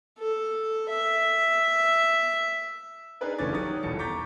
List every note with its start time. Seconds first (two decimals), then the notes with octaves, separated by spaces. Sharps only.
0.18 A4
0.89 E5
3.21 D4 D#4 G#4 A#4 B4 D5
3.38 F#1 E3 A3 C#4 D6 A6
3.52 D#3 F#3 G4 D#6 A6
3.83 D#1 E2 B2 A4 A6 C#7
3.99 A#5 C#6 D6 G6 A6 B6